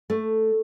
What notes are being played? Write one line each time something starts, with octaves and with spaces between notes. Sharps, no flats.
A3